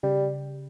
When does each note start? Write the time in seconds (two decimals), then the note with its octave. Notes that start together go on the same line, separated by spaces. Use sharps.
0.03 C#3 G3